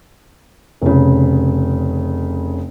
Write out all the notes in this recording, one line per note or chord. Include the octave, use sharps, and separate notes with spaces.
F1 C#3